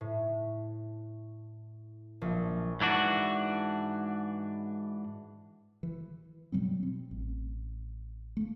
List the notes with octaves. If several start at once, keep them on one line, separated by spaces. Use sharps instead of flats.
A2
A#1
G#2 E3 D4 F#4
E3
B2 F#3 G3 C4
C4
A1
A3 A#3